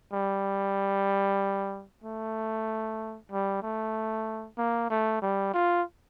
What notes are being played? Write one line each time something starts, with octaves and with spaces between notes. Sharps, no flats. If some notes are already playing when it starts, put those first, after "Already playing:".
G3
A3
G3
A3
A#3
A3
G3
F4